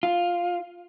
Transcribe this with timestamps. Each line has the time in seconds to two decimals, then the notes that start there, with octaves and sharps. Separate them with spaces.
0.03 F4